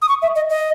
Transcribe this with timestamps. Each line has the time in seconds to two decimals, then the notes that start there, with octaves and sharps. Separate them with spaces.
0.02 D#6
0.09 C#6
0.22 E5
0.36 D#5
0.50 D#5